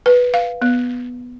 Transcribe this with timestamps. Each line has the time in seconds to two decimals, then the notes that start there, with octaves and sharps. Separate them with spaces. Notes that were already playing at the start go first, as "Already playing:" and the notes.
0.06 B4
0.34 F5
0.62 B3